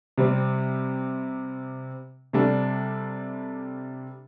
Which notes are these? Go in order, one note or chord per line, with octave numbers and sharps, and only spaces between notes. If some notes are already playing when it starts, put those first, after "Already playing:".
C3 G3 C4
C3 G3 D4 A4